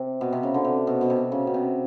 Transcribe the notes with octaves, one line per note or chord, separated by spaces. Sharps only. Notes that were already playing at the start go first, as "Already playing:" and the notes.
Already playing: C3
B2
C3
C#3
D3
C3
B2
B2
C3
C#3
B2
C3